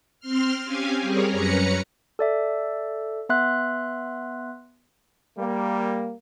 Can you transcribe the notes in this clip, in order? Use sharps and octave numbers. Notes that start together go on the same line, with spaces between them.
C4 C6 F6
C4 C#4 G4 F5 G#5
G3 C4 G#4 A#4 C#5
F#2 C#4 B4 A#5 C#7
A4 D5 E5
B3 E5 C6 F#6
G3 A#3